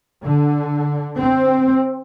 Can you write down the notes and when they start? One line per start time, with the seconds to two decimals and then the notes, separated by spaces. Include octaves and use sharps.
0.22 D3
1.19 C4